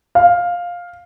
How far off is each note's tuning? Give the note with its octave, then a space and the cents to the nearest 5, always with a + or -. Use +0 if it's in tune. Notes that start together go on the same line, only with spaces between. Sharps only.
F5 +10